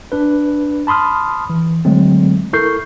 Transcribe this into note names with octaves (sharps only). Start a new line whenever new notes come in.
D4 B4
A5 B5 C6 D#6 F6
E3
D3 F#3 G#3 A3 C4
E4 A4 A#4 C#6 G6 C7